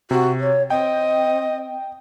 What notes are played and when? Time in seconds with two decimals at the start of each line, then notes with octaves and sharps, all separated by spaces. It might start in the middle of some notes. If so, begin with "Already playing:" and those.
0.11 C3 F#4
0.40 C#5
0.70 C4 D#5 G5